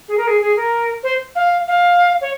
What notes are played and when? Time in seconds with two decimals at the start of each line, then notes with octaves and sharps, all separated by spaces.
0.08 G#4
0.17 A#4
0.27 G#4
0.41 G#4
0.56 A#4
1.03 C5
1.35 F5
1.68 F5
2.21 C#5